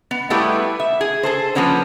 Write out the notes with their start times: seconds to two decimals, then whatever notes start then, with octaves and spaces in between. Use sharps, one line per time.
0.11 B3
0.30 G3 A3 B3 E4 G4
0.80 E5
1.01 G#4
1.23 G#4 A4 C5
1.55 F3 A#3 B3 C#4 D4